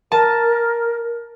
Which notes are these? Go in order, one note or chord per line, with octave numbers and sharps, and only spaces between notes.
A#4 A5